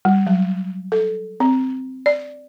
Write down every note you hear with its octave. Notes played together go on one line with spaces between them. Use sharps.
G3
F#3
A4
C4
D5